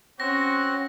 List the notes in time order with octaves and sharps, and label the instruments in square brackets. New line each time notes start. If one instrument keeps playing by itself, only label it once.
[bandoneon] C4 [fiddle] C#4 [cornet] F#4 [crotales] A#6